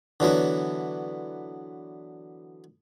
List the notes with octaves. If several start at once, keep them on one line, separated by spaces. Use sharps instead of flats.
D3 E3 F#3 B3